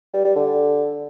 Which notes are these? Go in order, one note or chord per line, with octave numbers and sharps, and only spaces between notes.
G3
G3
D3